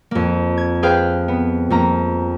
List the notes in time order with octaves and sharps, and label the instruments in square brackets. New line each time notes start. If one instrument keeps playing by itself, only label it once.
[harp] F2 A#3
G#6
G#4 B4 C5 F5 G5
B3
F2 A#3 A#5